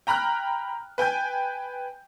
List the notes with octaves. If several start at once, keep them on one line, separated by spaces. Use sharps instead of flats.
G5 A#5 B5 F6 F#6
B4 G5 G#5 G6